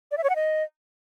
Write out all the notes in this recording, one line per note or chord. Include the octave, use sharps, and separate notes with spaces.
D5
E5
C#5
F#5
D#5